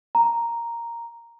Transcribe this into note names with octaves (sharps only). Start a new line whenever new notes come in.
A#5